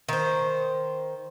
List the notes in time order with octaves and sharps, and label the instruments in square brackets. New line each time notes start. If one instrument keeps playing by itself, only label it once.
[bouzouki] D#3 C5